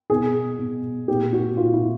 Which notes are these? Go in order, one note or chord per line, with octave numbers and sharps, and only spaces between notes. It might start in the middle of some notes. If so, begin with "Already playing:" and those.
B2 G#4
B2
A#2 G4
F#4
A#2 F4
E4